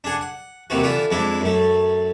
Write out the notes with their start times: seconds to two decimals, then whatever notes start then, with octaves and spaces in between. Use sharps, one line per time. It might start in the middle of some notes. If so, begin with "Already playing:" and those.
0.04 D4 G#4 F#5
0.21 F#5
0.70 D#2 C3 E3 F#4
0.83 D3 E3 E4 F4
1.10 F2 G#3 D4 E4
1.41 F#2 A3